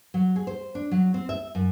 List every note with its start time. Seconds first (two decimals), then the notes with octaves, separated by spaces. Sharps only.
0.14 F#3
0.36 G#4
0.47 C5
0.75 D4
0.91 F#3
1.14 C4
1.29 E5
1.55 F#2